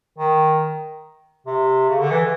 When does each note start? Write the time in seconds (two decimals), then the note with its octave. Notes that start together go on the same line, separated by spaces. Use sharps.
0.19 D#3
1.47 C3
1.89 C#3
2.00 D3
2.11 E3